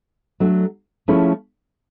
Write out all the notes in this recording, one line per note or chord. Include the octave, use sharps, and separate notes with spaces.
F#3 A3 D4
F3 A3 C#4 E4 G#4